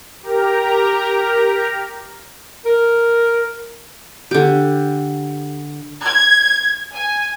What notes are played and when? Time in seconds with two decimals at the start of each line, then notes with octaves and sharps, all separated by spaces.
0.23 G4 A#4 A#5
2.66 A#4
4.31 D3 G4
6.05 G#6
6.94 G#5